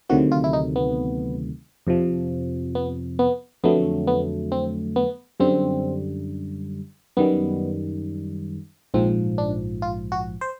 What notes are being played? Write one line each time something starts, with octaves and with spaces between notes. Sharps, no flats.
D2 C3 D#3 F#3 A3 F#4
F4
E4
D#4
B3
F2 C3 F3
B3
B3
F2 D3 F#3 A3 B3
B3
C4
B3
F#2 D3 G3 C4
F#2 D#3 G3 B3
A#1 G#2 F3 C4
D4
F4
F#4
C5